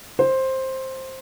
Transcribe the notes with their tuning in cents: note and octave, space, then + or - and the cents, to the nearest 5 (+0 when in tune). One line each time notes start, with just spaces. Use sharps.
C5 +10